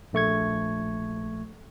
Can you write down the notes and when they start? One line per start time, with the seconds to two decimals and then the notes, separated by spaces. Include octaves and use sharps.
0.13 A#1 A3 C#6 G#6